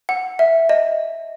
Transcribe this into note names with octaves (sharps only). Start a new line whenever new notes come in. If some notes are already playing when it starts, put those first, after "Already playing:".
F#5
E5
D#5